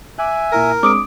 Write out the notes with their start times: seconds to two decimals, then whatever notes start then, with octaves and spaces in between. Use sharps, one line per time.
0.18 E5 G#5 D6 F#6
0.52 A#2 E4 A#4 A#6
0.83 G#3 C4 D4 D6 D#6 D7